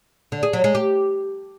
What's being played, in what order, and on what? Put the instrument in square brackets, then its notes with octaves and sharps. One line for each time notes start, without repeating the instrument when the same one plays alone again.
[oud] D3
G#4
F#3
G#3
G4